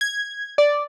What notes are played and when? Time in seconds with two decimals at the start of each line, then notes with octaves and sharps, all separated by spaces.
0.01 G#6
0.58 D5